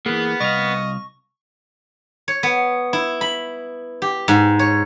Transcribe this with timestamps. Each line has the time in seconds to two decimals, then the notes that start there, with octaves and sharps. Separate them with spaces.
0.06 E3 A#3 B3 G#4
0.41 C2 D#5 F5 C#6
2.28 C#5
2.43 B3
2.93 E4
3.21 B5
4.02 G4
4.28 G#2
4.59 C#5